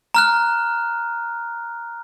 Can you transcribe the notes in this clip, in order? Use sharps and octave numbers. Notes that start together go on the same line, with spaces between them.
A#5 F6 F#6